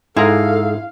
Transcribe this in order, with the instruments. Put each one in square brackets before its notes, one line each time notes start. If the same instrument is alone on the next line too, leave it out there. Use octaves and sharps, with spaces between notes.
[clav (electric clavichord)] G#2 G#4 A#5 [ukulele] E4 [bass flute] A4 [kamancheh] F5